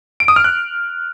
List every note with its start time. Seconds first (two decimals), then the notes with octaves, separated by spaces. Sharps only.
0.20 D7
0.28 D#6
0.36 F6
0.44 F#6